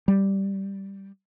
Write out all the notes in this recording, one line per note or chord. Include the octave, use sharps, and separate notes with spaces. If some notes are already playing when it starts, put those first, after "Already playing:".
G3